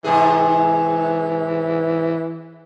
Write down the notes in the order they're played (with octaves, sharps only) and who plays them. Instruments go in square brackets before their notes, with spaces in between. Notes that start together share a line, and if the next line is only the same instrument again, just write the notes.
[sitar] G#2 C3 G#4 [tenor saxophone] E3